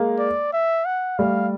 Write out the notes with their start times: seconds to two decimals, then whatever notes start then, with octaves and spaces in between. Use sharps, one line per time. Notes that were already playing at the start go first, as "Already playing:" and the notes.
Already playing: G#3 A#3
0.19 D5
0.53 E5
0.85 F#5
1.18 G3 A3 F5